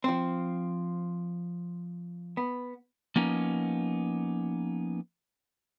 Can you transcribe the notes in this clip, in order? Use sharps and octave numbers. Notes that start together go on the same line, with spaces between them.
F3 C4
B3
F3 A#3 B3 C#4 D#4